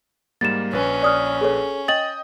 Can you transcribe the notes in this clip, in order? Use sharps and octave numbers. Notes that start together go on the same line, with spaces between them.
G#2 G3 A#3 A6 E7
A#1 C#4 B4
D5 D#6 F6
G#4 A4 C#5
D#5 G5 D#6 A6 F#7